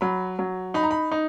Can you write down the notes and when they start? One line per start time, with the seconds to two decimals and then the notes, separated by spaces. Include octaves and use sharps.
0.01 F#3 B5
0.39 F#3
0.74 D#4 B5
0.83 A#5
0.91 B5
1.11 D#4